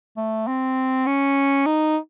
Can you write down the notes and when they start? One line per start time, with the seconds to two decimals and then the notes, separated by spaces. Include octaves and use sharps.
0.17 A3
0.48 C4
1.06 C#4
1.66 D#4